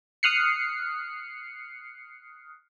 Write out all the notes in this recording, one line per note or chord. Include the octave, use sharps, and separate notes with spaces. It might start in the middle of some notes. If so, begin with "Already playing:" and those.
D#6 F6 F#6 C7 C#7